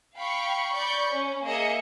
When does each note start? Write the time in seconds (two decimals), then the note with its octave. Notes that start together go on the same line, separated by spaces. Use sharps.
0.16 F5 G5 B5 C#6
0.74 D5 B5 C#6 G6
1.13 C#4
1.45 A#3 G#4 D#5 E5 C#7